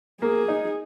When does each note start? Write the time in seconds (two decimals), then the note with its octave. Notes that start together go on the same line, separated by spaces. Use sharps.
0.21 A#3 G#4
0.48 D#4